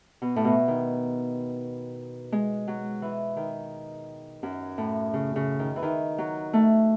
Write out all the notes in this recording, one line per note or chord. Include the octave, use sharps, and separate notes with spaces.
B2
A2
B2
D#3
G#3
F#3
E3
D#3
F#2
A2
C#3
C#3
D#3
E3
D#3
F#3
A3